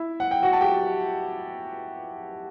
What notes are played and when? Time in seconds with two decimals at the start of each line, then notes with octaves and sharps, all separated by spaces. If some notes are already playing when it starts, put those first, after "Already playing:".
Already playing: E4 E5
0.20 F#5
0.31 G5
0.43 F#4 F#5
0.53 A5
0.61 G4 G5